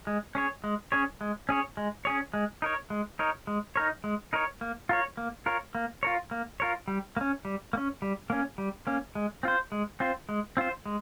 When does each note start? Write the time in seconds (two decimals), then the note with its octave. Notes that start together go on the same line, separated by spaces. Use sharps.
0.07 G#3
0.35 C#4 G#4 C#5
0.64 G#3
0.92 C#4 G#4 C#5
1.21 G#3
1.49 C#4 G#4 C#5
1.77 G#3
2.05 C#4 G#4 C#5
2.34 G#3
2.62 D#4 A#4 C#5
2.90 G#3
3.19 D#4 A#4 C#5
3.47 G#3
3.76 D#4 A#4 C#5
4.04 G#3
4.33 D#4 A#4 C#5
4.61 A#3
4.89 F4 A#4 C#5
5.17 A#3
5.46 F4 A#4 C#5
5.75 A#3
6.03 F4 A#4 C#5
6.31 A#3
6.60 F4 A#4 C#5
6.88 G3
7.17 A#3
7.21 C#4
7.45 G3
7.73 A#3
7.77 C#4
8.02 G3
8.30 A#3 C#4
8.58 G3
8.87 A#3 C#4
9.15 G#3
9.43 C4 F4 C5
9.72 G#3
10.00 C4 F4 C5
10.29 G#3
10.57 C4 F4 C5
10.86 G#3